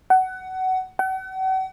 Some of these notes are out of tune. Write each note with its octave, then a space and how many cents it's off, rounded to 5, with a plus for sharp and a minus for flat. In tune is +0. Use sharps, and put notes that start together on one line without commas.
F#5 +20
F#5 +40